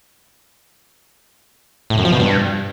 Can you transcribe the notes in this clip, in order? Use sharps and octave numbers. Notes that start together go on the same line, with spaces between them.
A2
F#2
F3
B2
G2